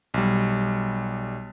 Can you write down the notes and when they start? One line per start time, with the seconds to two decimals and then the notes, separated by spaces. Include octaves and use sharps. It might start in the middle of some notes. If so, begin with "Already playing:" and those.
0.14 B1 G3